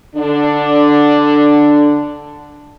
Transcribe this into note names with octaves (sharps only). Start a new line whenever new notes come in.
D3 D4